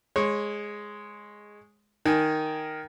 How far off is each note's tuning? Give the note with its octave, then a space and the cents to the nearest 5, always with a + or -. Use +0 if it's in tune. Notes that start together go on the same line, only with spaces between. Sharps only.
G#3 +0 C#5 -25
D#3 +0 A#4 +0 G#5 +0